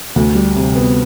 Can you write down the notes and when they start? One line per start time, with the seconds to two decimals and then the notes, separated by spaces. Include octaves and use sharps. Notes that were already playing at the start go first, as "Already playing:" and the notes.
0.16 D2
0.35 G3
0.56 C3
0.76 B3